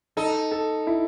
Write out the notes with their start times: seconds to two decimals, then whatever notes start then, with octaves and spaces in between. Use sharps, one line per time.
0.17 D#4 A4
0.52 A4
0.87 E4